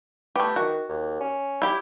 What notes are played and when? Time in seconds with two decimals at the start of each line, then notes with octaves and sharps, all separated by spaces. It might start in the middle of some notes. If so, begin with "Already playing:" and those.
0.36 A3 B3 G4
0.56 D#3 F#4
0.89 D#2
1.20 C#4
1.62 E4 G4